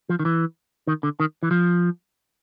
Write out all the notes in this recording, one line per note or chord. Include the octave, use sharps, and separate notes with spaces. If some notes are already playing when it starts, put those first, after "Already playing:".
F3
D#3
E3
D#3
D3
D#3
E3
F3